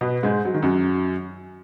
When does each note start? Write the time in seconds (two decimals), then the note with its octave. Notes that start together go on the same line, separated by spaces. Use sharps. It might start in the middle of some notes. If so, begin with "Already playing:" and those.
0.01 B2 B3
0.23 G#2 G#3
0.45 F#3
0.54 D#3
0.62 F#2 F#3